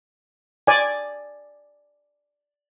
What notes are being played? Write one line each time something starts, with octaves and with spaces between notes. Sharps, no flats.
D5 G#5